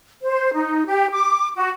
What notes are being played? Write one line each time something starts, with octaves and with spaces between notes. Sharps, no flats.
C5
D#4
G4
D6
F#4